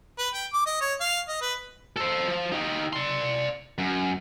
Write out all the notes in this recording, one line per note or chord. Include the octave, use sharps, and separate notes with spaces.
B4
G5
D6
D#5
C#5
F5
D#5
B4
A4 C5
F3
D#4 G4
D5 C6
F#2